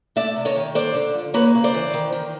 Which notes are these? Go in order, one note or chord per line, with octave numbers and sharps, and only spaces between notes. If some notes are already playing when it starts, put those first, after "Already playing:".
A3 D5 E5
C3
C#5 D#5
D#3
D3 C5 D5
D3
F3
A#3 B4 C#5
C#3
C5 D5
E3
D#3
D#3